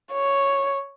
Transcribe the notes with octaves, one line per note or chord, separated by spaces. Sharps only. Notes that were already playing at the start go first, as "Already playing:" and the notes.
C#5